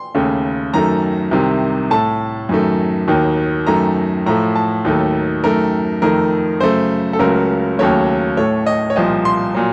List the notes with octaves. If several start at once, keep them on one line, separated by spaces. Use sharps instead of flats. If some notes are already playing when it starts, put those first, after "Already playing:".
Already playing: C6
D#2 C#3 A3
F#2 D#3 A3 A#5
C2 C3 D#3
A2 A3 A5
F#2 D#3 A3
D#2 D#3 F#3
F#2 D#3 A3 A#5
A2 F3 A3 A#5
A5
D#2 D#3 F#3 A3
F#2 D#3 A3 A#4
F2 D#3 A3 A#4
F#2 C#3 A3 C5
A4
C#2 C#3 F#3 A3 A#4
D#2 C#3 F#3 A3 C#5
A2 A3 C#5
D#5
C#5
C2 A#2 F3 D#5
C6
A#2 F#3